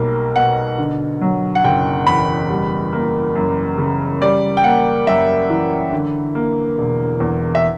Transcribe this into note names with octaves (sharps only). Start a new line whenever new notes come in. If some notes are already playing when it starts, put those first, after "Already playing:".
Already playing: B1 G3 A#3
B2 F#5
D3
F#3
F#5
F#1 G5
E2 B5
G3
A#3
F#2
C#3
G3 D5
G5
A#3 F#5
F#2 E5
E3
D3
A#3
E1
E2
E5